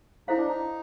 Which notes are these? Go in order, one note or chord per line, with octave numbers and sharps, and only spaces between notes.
D#4 E4 A4 C5 F5
D4
D#4